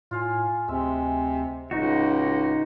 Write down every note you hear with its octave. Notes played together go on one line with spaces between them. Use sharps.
A2 F4 F5 G#5
D2 C3 G#3 E5
D1 C#2 D#4 F#4 B4